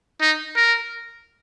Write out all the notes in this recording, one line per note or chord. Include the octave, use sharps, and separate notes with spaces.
D#4
A#4